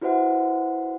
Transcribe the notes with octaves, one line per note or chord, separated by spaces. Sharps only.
E4 F#4 B4 C5 E5 F#5